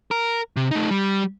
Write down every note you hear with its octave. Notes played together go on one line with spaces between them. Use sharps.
A#4
C3
A3 D#4
G3